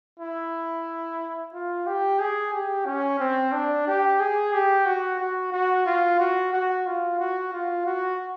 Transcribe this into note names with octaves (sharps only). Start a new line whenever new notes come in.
E4
F4
G4
G#4
G4
C#4
C4
D4
G4
G#4
G4
F#4
F#4
F#4
F4
F#4
F#4
F4
F#4
F4
F#4